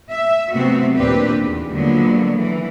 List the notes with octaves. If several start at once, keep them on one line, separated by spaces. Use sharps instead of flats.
E5
C3 F#3 A3 B3 C4 F#4
D#2 A#2 C4 D4 G4 B4
E2
D3 F3 F#3 G#3 A#3 B3
E3